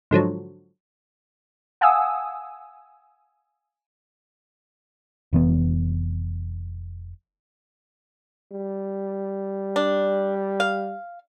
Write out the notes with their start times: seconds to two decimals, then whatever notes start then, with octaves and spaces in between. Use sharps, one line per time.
0.11 G#2 D3 F3 F#3
1.81 F5 F#5 G#5 A5 D#6 E6
5.33 F1 E3 B3
8.52 G3
9.76 D4
10.60 F5